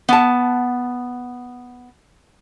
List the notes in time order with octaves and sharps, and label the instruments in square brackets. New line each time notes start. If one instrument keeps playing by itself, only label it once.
[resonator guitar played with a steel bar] B3 A5